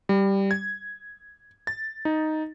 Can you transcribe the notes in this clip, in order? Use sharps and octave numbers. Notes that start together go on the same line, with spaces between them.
G3
G#6
A6
D#4